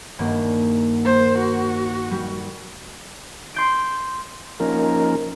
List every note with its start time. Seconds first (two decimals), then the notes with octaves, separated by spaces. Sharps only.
0.19 D#1 G2 A#3
1.05 A#3 C5
1.38 F#4
2.11 G3
3.54 C6 G6 D7
4.60 F3 A#3 C#4 D#4 A#4